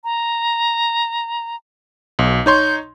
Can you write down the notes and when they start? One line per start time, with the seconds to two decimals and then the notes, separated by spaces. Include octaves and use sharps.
0.04 A#5
2.19 B1
2.46 D#4 C#5 C6 G6